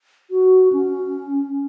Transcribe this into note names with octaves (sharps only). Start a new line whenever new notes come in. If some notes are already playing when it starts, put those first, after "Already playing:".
F#4
C#4